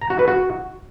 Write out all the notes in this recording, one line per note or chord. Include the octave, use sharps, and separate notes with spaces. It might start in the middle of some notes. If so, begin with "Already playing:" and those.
A#5
F#4
B4
F#4